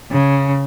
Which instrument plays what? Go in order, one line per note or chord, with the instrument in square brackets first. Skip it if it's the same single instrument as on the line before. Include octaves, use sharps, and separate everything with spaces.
[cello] C#3